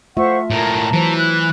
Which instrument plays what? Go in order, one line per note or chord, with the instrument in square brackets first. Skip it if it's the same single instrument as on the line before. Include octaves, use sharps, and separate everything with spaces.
[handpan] A3 F4 E5 [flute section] C5 F#5 C#6
[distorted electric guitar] A2 A#3 [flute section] A5 A#5
[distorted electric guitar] E3 [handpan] F#3 C5
[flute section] B5 F#6